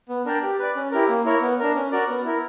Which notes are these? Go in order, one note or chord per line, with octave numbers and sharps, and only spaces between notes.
B3
D4 A#4 D5 G5
G4
B4 D5
C#4
E4 G4 A#4
A#3
E4 A#4 C#5
B3
D4 A#4
C#4
F#4 A#4 D5
B3
E4 A#4